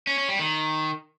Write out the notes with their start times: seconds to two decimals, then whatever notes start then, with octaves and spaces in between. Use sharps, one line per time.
0.07 C#4
0.18 C#4
0.29 G3
0.39 D#3